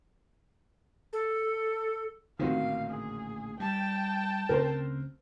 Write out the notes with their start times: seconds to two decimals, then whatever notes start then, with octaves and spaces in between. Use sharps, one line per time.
1.13 A4
2.39 A1 A#2 D3 D#3 C4 F#4 F5
2.90 G#4
3.60 G3 G5 A5
4.49 D2 C#3 C4 A#4 C5